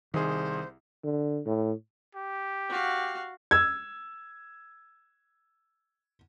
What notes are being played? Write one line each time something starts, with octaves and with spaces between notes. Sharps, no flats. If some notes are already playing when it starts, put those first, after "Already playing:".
C2 D#3 G#4 C5
D3
A2
G4
F#4 F5
E6 G#6